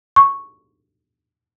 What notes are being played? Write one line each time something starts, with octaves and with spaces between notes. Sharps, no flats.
C#6